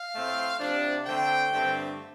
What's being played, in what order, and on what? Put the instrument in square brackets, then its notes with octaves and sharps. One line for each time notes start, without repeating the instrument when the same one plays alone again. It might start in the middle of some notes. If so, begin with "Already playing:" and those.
Already playing: [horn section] F5
A2 A3 C4
C3 F3 D4
D3 A3 C4 G5
G2 D3 A3 C4